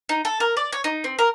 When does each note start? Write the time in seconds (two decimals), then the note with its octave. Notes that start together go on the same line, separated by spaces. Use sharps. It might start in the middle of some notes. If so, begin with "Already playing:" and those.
0.09 D#4
0.25 A4
0.40 A#4
0.57 D5
0.72 C#5
0.84 D#4
1.04 C4
1.19 A#4